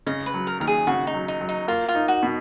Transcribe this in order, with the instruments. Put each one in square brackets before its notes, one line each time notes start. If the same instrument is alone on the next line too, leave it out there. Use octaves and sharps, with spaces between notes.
[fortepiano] C#3 [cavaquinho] D#5
[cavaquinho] B4
[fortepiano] F#3
[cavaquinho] A#4
[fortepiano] D#2 [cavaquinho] A#4
[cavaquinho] G#4
[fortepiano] C#3 [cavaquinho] F#4
[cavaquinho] D#4
[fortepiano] F#3
[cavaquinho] D#4
[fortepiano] F#3
[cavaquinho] D#4
[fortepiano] A#3 [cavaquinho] F4
[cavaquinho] F4
[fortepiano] D#4
[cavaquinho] F#4
[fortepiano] B2